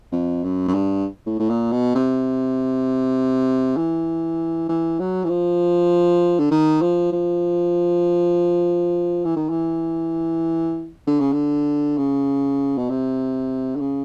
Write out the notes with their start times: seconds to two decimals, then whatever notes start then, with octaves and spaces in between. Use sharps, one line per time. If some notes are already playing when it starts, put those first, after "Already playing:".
0.12 F2
0.44 F#2
0.68 F#2
0.74 G2
1.26 A2
1.40 A2
1.50 A#2
1.72 B2
1.95 C3
3.77 E3
4.69 E3
4.99 F#3
5.24 E3
5.29 F3
6.39 D3
6.51 D#3
6.81 F3
7.12 F3
9.25 E3
9.36 D#3
9.50 E3
11.07 D3
11.20 C#3
11.33 D3
11.98 C#3
12.77 B2
12.89 C3
13.76 D3
13.80 C#3